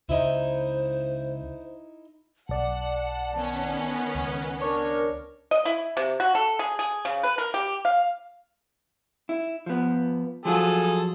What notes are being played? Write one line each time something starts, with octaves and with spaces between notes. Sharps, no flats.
C#2 C#3 D#4 E4 C5
B1 D5 F#5 A5
D#3 B3 C#4
C#2
D4 A#4 C#5
D#5
E4
C3
F#4
A4
G#4
G#4
C#3
B4
A#4
G4
F5
E4
F3 B3
F3 F#3 F4 G#4 A4